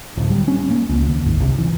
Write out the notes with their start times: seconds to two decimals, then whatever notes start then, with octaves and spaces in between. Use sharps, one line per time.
0.17 D1
0.30 G3
0.48 C#4
0.70 A#3
0.89 C#2
1.08 D#2
1.25 G#1
1.40 C2
1.58 E3